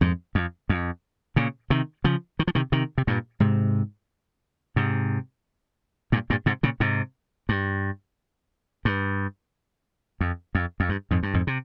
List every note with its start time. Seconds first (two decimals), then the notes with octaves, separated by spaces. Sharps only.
0.01 F2 G#2
0.35 F2
0.69 F2
1.36 A#2 C#3
1.70 C3 D#3
2.04 C#3 F3
2.39 D#3
2.47 F3
2.55 C3 D#3
2.72 C3 D#3
2.98 C3
3.07 G2 A#2
3.40 G#2 C3
4.76 G#2 C3
6.12 G2 A#2
6.30 G2 A#2
6.46 G#2 C3
6.63 A#2 C#3
6.80 G#2 C3
7.49 G2
8.85 G2
10.21 F2
10.55 F2
10.80 F2
10.89 G2
11.11 F2 G#2
11.23 G2
11.34 F2 G#2
11.47 C3